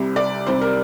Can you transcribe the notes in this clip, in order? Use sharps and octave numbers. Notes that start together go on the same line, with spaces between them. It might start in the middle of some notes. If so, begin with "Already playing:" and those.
Already playing: C2 C3 G3
D5
C2 C3 G3 C5
A#4